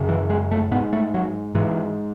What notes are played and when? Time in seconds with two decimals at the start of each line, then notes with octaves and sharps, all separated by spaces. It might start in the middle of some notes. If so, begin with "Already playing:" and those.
Already playing: F#2 C#3
0.09 E3
0.30 G#3
0.52 A3
0.71 G#2 B3
0.93 A3
1.14 F#3
1.55 G#2 E3